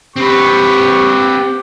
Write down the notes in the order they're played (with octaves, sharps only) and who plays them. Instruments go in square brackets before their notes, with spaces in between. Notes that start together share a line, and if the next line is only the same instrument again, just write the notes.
[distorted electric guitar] C4 B4 [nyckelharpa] G4 [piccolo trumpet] C#6